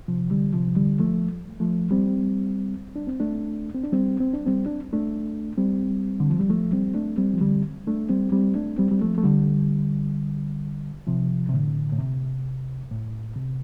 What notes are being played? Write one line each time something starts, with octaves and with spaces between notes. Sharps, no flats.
C3 F3
D3 G3
C3 F3
D3 G3
F3 A3
F3 A3
G3 C4
D4
C4
A3 D4
C4
D4
G3 C4
C4
D4
G3 C4
D4
A3 D4
G3 C4
D3
F3
G3
F3 A3
G3 C4
A3 D4
G3 C4
F3
D3 G3
A3 D4
G3 C4
G3 C4
A3 D4
G3 C4
G3
F3 A3
A3
D3 G3
C3 F3
C3
A2 D3
A2
C3
A2
C3